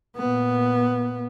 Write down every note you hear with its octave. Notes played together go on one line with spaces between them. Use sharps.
A#2 B3